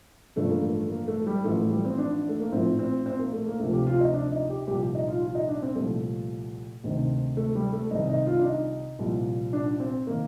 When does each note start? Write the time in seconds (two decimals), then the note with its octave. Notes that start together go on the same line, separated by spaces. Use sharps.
0.36 A1 G2 D3 F3 A3
0.49 A#3
0.62 A3
0.90 A#3
1.08 A3
1.27 G3
1.44 A1 A2 F3 A3
1.58 A3
1.71 G3
1.85 C4
1.98 D4
2.29 A3
2.40 A#3
2.52 A#1 A2 F3 C4
2.79 C4
3.06 C4
3.19 A#3
3.33 A3
3.46 A#3
3.60 D2 C3 F3 A3
3.73 G4
3.87 F4
4.00 D#4
4.14 D4
4.32 D#4
4.50 G4
4.67 C2 A#2 F3 G4
4.95 D#4
5.08 F4
5.21 F4
5.35 D#4
5.49 D4
5.62 C4
5.75 C2 A#2 F3 A3
6.84 D2 C3 D#3
7.37 A3
7.55 G3
7.73 A3
7.91 C2 C3 D#3 D#4
8.09 D#4
8.27 F4
8.39 D4
8.45 D#4
8.99 C2 A#2 F3
9.53 D4
9.80 C4
10.07 D#3 A#3